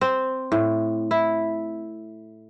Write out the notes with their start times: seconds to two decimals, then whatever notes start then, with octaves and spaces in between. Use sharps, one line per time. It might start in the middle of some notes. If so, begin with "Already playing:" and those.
0.01 C4
0.52 A2
1.11 E4